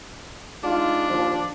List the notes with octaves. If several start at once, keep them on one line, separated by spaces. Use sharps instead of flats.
G#3 D4 D#4 F4
D#2 F3